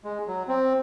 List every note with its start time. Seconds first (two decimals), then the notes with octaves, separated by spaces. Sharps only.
0.04 G#3
0.27 F#3
0.48 C4